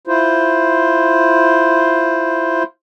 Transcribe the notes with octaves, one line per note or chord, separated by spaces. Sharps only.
E4 F4 C5